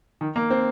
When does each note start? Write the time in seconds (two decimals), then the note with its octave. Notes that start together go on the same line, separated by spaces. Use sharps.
0.21 D#3
0.36 A#3
0.50 C4